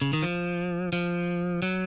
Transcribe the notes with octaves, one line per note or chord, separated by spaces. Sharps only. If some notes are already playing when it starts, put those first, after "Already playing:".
C#3
D#3
F3
F3
F#3